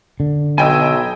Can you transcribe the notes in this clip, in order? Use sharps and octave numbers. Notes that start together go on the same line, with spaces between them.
D3
B1 D#5 G5 G#5 B5 E6